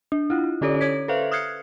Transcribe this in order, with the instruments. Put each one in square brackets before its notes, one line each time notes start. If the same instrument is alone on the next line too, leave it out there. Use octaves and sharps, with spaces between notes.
[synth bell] D4
E4 F4
D3 C#4 G4 A4 C#5 D5
C#5 G#6 B6
A4 B4 C5 E5 F5
D#6 F6 F#6 G#6 C7 C#7